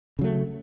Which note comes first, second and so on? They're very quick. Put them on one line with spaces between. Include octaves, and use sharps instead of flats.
C#3 F#3 A3